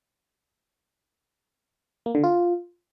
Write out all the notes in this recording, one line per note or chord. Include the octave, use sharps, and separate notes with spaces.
A#3
D3
F4